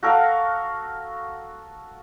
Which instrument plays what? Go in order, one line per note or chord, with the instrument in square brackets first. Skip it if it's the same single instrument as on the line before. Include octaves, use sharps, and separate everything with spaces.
[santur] F#4 A4 A#4 F5